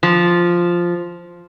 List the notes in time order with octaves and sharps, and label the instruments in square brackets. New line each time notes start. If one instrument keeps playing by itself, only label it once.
[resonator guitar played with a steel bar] F3